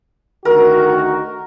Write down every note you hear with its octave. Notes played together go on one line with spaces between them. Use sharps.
D2 D#3 F#4 A#4